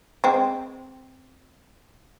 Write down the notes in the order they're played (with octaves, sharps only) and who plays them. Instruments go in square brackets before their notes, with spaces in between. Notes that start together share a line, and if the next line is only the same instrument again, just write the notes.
[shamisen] G#3 C4